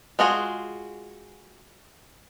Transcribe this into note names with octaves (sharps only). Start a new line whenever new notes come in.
G#3 F4 F#4 G#4